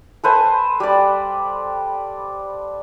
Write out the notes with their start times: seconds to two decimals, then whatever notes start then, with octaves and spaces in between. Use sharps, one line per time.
0.24 A4 B4 C5 G#5
0.80 G3 D5